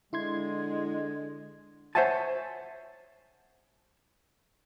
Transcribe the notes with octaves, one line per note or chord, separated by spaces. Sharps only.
D3 G#3 E4 C6 G#6
C5 C#5 E5 F#5 G#5 A5